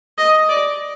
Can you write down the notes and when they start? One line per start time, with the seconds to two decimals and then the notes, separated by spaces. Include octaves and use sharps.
0.18 D#5
0.49 D5